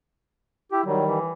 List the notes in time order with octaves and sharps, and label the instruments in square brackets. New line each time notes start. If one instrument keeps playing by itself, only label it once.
[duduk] E4 [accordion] G4
[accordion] D#3 G3 [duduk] F#3
[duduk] E3